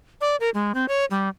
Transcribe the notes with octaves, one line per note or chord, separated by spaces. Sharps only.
D5
A#4
G#3
C4
C#5
G3